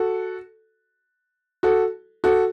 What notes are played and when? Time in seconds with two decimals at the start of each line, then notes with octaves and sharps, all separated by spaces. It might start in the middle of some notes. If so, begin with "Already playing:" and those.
Already playing: F#4 A4
1.63 F#4 A4
2.24 F#4 A4